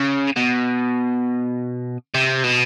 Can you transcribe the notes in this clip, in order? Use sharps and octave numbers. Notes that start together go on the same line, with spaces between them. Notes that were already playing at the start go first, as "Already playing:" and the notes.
Already playing: C#3
B2
C3
B2